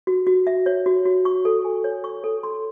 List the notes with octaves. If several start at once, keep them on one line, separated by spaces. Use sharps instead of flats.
F#4
F#4
E5
C#5
F#4
F#4
C#6
A4
G#5
C#5
C#6
A4
C6